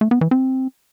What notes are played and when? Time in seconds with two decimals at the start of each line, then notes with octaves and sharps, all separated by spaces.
0.01 A3
0.11 B3
0.21 E3
0.31 C4